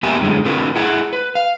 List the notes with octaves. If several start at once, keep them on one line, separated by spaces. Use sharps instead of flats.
A#3 B3 G4 A#4 E5 G#5
F#2 A2 D3 G3 G#3
A2 D3 C4 F4 A#4 B4
A3 E4 G#4 F#5
B4
F5